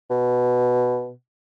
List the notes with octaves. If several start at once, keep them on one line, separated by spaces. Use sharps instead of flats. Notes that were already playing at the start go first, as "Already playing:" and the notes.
B2